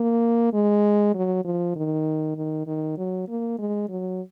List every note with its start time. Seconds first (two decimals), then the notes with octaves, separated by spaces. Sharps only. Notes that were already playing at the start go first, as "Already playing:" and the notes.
Already playing: A#3
0.53 G#3
1.14 F#3
1.45 F3
1.76 D#3
2.36 D#3
2.67 D#3
2.97 F#3
3.28 A#3
3.59 G#3
3.89 F#3